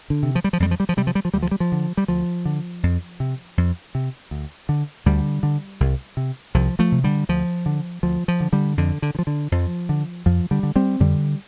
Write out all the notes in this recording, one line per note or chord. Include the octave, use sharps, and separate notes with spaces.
D3
C3
F3
G3
F3
F2 G3
F3
G3
F3
C3 G3
F3
G3
F3
D2 G3
F3
G3
F3
D3
G3
D2 F3
D3
F2
C3
F2
C3
D2
D3
D2 D3 G3
D3
C2
C3
C2 F3
F3 A3
C3
D3 G3
D2 F3
D3
D2 F3
F3
D3
D3 G3
F2 D3
D3
D3
F3
D3
F2 F3
D3
F2 F3
D3 G3
D3
G3 C4
F2 D3 G3